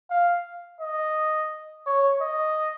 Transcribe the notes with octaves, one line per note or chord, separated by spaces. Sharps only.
F5
D#5
C#5
D#5